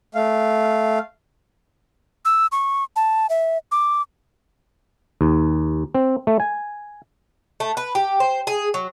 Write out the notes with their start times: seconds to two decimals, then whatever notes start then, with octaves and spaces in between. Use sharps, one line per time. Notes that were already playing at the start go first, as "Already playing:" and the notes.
0.15 A3 F5
2.25 E6
2.52 C#6
2.96 A5
3.30 E5
3.72 D6
5.21 D#2
5.95 C4
6.27 A3
6.40 G#5
7.60 A3
7.77 B4
7.95 G4
8.20 C5
8.47 G#4
8.74 F#3